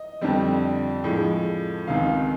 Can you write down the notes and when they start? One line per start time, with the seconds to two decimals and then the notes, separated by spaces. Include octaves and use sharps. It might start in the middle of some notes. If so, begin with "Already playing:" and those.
Already playing: D#5
0.21 F2 D3 G3 C4
1.04 A2 F3 G#3
1.87 C#2 C3 D#3 F5